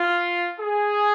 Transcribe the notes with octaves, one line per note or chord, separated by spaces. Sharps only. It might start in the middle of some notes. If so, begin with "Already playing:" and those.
Already playing: F4
G#4